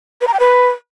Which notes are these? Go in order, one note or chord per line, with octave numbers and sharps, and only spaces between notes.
B4
A#5
G5
B4